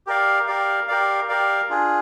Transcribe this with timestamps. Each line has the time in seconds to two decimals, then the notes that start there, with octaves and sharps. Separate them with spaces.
0.07 G4 A#4 D5 F5
0.47 G4 A#4 D5 F5
0.88 G4 A#4 D5 F5
1.28 G4 A#4 D5 F5
1.70 D4 F4 G#4